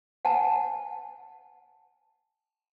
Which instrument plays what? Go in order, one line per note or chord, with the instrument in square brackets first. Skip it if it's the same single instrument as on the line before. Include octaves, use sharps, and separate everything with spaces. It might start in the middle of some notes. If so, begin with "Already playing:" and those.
[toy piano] F#5 G#5 A5